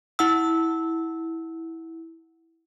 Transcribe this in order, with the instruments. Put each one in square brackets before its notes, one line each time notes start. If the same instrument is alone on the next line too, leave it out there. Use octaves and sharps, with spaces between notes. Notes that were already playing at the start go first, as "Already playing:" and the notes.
[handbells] E4 F#5 E6